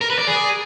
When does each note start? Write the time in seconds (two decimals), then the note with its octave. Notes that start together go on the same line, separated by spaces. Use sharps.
0.01 A#4
0.10 B4
0.19 D5
0.27 G#4